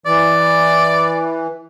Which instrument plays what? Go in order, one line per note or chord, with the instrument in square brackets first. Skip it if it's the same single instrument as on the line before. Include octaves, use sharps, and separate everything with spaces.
[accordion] E3 [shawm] D5